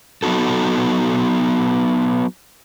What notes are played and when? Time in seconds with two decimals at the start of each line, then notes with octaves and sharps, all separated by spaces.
0.23 F#3 B3 D#4 F#4 A4